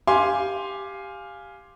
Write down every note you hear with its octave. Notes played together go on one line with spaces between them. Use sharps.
G4 F5 G#5 C6 D6